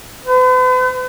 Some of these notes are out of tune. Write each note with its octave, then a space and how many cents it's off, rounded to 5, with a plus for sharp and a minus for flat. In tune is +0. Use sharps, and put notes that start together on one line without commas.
B4 +45